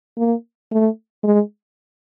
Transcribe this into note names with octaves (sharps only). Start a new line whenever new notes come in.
A#3
A3
G#3